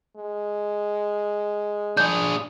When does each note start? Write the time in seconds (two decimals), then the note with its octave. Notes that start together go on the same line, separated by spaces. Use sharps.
0.17 G#3
1.97 D4 G#4 G6